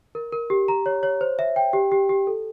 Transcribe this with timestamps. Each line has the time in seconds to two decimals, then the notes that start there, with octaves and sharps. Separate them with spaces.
0.15 A#4
0.32 A#4
0.50 G4
0.68 A#5
0.86 C#5
1.03 C#5
1.21 C5
1.39 E5
1.56 G5
1.73 G4
1.92 G4
2.09 G4
2.27 A4